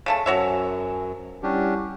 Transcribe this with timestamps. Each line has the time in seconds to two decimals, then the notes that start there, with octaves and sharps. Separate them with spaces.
0.06 C#3 A3 A5
0.26 F#2 F#4 C5 C#5 E5 G#5
1.43 G3 C#4 D4 E4 G4 F#5